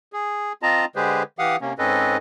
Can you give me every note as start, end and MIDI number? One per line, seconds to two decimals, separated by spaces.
0.13 0.53 68
0.63 0.85 60
0.63 0.85 65
0.63 0.85 75
0.63 0.85 81
0.63 0.85 82
0.96 1.23 50
0.96 1.23 56
0.96 1.23 67
0.96 1.23 68
0.96 1.23 71
0.96 1.23 72
1.39 1.56 52
1.39 1.56 67
1.39 1.56 77
1.39 1.56 78
1.39 1.56 87
1.61 1.73 48
1.61 1.73 58
1.61 1.73 61
1.78 2.17 44
1.78 2.17 60
1.78 2.17 61
1.78 2.17 69
1.78 2.17 71
1.78 2.17 75